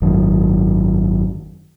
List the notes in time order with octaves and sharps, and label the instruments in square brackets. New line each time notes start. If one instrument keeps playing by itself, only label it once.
[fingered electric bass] G#1 F#2 D#3